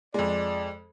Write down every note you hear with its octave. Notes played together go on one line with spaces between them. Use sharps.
F2 G#3 D5